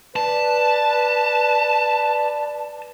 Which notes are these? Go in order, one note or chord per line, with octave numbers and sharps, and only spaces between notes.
B4 D5 A5